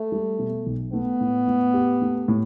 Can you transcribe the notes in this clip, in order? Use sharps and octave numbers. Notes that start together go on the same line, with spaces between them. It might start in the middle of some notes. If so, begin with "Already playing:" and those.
Already playing: A3
G3
B2
B1
A3 B3
A2
A2
G4
A3
A2